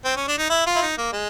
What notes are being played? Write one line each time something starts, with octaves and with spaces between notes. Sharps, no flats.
C4
C#4
D4
D#4
E4
F4
E4
D#4
A#3
G#3